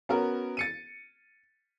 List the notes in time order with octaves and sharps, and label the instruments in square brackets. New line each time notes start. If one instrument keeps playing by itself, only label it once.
[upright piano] B3 C#4 F#4 A#4
A6 C#7 D#7